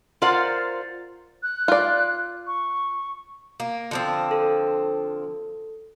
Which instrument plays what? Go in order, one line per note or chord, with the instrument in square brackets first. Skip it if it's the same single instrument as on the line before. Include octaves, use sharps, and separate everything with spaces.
[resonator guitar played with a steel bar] F4 A#4 C5 D5 F#5
[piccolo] F#6
[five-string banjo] F4 D5
[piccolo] C#6
[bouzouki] A#3
D3 F3 C4
[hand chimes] A4